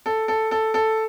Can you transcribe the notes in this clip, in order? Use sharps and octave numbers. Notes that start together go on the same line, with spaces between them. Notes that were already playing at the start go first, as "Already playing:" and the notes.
A4
A4
A4
A4